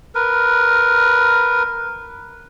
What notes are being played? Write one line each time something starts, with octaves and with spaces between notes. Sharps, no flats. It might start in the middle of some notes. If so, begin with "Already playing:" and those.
A#4 B4